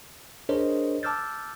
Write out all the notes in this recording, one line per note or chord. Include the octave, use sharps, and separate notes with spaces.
D4 G#4 A#4 C5 C#5 D#5
A5 D6 E6 F6 G6 A6